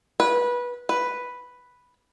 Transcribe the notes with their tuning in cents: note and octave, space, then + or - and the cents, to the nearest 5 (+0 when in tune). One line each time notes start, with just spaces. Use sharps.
B4 -20
B4 +0